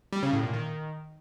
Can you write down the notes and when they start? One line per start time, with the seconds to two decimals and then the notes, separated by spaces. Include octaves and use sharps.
0.12 G3
0.23 C#3
0.33 A2
0.43 A#2
0.53 D#3